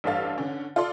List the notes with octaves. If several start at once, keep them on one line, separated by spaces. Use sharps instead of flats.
A1 G2 A4 F5 A6
D3 C#4
F4 A4 D5 C6